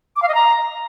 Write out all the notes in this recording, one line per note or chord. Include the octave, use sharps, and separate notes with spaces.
D6
F5
D#5
A#5